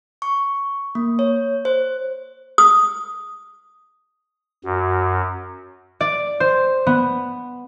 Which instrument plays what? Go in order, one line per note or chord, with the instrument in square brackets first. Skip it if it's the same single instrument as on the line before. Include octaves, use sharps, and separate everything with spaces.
[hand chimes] C#6
A#3
C#5
C5
[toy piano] D#6
[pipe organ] F#2 [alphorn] F#4
[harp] D5
C5
B3